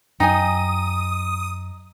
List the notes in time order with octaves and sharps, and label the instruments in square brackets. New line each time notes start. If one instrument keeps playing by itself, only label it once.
[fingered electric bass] F#2 F#3 [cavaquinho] D#4 [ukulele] G5 G#5 [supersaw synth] D#6